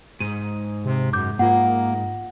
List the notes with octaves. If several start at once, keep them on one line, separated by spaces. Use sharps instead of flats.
G#2 D#7
C3
F#2 D6 G6
G#2 A#3 F4 F#5